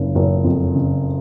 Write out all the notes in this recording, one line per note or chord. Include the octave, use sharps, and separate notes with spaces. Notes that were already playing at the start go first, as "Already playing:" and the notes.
Already playing: F#1 C#3
F#1
F2
C#3